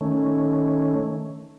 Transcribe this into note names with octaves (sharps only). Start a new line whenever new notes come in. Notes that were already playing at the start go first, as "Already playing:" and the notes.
D#3 A3 C#4